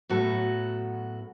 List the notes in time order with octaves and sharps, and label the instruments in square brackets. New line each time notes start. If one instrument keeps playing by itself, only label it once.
[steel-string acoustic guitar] A2 F#3 B3 F#4 A4